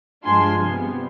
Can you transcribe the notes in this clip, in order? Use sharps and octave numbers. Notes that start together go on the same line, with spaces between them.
G2 F3 G#3 D4 F4 G#5 C6
C3 G3 B3